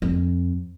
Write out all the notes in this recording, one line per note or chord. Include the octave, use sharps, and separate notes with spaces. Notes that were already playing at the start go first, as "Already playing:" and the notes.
F2